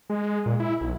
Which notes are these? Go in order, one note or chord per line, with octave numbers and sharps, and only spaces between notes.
G#3
A#2
E4
B1